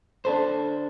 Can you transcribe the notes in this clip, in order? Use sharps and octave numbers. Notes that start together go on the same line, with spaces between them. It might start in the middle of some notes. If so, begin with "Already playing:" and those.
D4 A4 C5